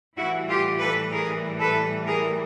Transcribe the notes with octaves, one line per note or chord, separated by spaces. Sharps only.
A2 E3 G3 E4 F#4
F4 G4
A4 B4
G#4 A#4
A4 B4
G#4 A#4